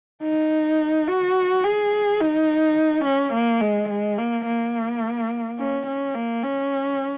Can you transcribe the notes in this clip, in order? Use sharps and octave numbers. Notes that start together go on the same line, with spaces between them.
D#4
F#4
G#4
D#4
C#4
A#3
G#3
G#3
A#3
A#3
C#4
C#4
A#3
C#4